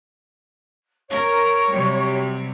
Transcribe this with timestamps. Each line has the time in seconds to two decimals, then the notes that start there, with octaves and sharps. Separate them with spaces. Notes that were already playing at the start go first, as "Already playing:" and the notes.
1.09 A#4 C#5
1.71 C3 F#3 G3